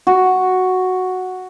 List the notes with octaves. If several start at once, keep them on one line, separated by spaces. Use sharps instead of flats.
F#4